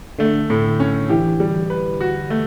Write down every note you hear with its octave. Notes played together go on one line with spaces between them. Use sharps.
D3 A3
A2
C#4
E3 G4
G3
B4
F#4
A3